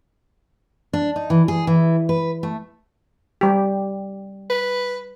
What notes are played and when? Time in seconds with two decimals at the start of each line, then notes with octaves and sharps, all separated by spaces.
0.93 D4
1.16 D#4
1.30 E3
1.48 G#4
1.67 E3
2.09 B4
2.43 A3
3.41 G3 G4
4.50 B4